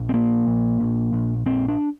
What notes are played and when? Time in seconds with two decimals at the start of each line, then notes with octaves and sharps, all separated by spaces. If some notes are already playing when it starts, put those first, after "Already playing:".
Already playing: A#1
0.09 C4
0.14 A#2 A#3
0.47 A#1
0.80 A#1
1.13 A#1
1.46 A#1 C4
1.68 D4